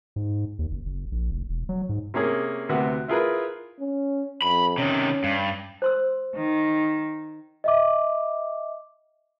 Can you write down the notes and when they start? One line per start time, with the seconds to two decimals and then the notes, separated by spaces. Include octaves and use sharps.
0.16 G#2
0.59 D#2
0.71 F#1
0.85 F#1
1.12 A#1
1.31 F1
1.49 E1
1.69 F#3
1.89 G#2
2.14 C3 A#3 C#4 G#4
2.69 D2 C3 B3 F#4
3.08 E4 F4 G#4 A#4 B4
3.80 C#4
4.42 F2 B5
4.78 C3 D#3 C#4
5.24 G2
5.82 C5 C6 E6
6.35 D#3
7.64 D#5 E5 D6